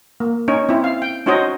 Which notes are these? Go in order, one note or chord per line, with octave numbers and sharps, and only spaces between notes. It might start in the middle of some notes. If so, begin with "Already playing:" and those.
A#3
C#4 D#4 C#5
C4 E4
F5
G5
C#4 D#4 F#4 C5 C#5 D#5